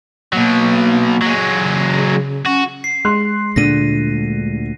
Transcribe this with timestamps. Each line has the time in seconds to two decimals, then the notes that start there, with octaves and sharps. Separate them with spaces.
0.33 B2 F#3 A#3
1.22 F#3 G#3
1.59 C#3
2.45 C#4 F#4
2.84 C7
3.05 G#3 C6 F#6
3.56 D2 A#2 D3 A3 A#6 D#7